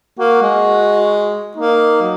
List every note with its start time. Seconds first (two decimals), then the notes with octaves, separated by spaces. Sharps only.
0.19 A#3 F#4
0.42 G#3
1.56 A#3 D#4
2.02 F#3